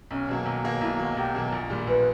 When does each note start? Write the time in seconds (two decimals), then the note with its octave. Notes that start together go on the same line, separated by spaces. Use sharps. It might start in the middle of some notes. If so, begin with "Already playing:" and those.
0.11 B1 C#4
0.28 B2 F#3 A#3
0.46 B1
0.64 B2 F#3 A#3
0.81 B1 E4
0.99 B2 F#3 A#3 F#4
1.17 B1 G4
1.35 B2 F#3 A#3
1.52 A#1
1.70 A#2 G3
1.87 A#1 B4